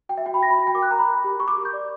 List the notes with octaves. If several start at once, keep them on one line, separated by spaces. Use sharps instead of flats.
F#4 G5
E5
F#4 G5
B5
F#4 A#6
B5
F#4
G5
A#4 D6
F#6
A#4 A#5
B5
A#4
G4
A#4 C#6
D6
G4
G6
D5